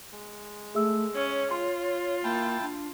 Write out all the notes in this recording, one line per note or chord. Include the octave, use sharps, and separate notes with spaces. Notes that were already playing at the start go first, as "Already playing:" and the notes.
G#3
A3 G#4 E5 E6
C#4 C#5
F4 C6
A#3 E4 G5 A5
D4